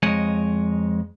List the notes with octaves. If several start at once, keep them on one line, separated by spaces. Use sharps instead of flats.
F2 G#3 C#5 D#5